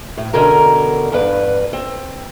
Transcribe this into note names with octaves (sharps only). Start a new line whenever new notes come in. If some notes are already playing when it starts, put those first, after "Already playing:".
A2
E2 B2 D3 C#4 A#4 A#5
E2 G2 B4
C4